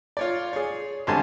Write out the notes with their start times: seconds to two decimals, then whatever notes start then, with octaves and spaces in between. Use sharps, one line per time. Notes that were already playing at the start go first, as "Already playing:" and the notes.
0.17 F4 C#5 D5
0.53 G#4 C#5
1.07 G#1 G2 D3 G3 G#5 A5